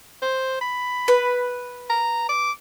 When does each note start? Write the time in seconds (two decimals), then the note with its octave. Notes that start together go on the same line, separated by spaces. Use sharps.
0.22 C5
0.61 B5
1.08 B4
1.90 A#5
2.29 D6